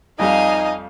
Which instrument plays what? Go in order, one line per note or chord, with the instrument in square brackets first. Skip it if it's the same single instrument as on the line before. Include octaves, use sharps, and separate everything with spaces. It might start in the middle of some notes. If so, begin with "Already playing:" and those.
[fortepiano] F2 G3 [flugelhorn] D#4 [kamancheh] D#5 G#5 [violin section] F5